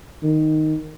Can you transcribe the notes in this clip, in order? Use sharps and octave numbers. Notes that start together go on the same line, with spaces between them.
D#3